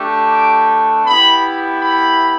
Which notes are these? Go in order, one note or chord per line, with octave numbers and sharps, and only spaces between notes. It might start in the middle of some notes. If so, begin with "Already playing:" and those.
Already playing: A3 D4 G4
D6
B3 E4 G4 B5
B5